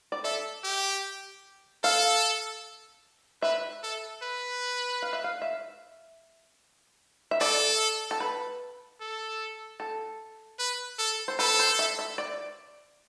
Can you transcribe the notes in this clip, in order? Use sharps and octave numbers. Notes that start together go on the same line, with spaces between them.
D5
A4 E5
G4
A4 F5
B4 E5
A4
B4
F5
E5
F5
E5
E5
A4 D5
A4
B4
A4
A4
B4
A4
C5
A4 B4
C5
E5
E5
D5